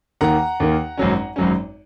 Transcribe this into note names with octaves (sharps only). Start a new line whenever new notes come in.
D#2 D#3 A#3 F#5 A#5
D#2 D#3 A#3
G#1 F#2 F#3 C#4
G#1 F#2 F#3 C#4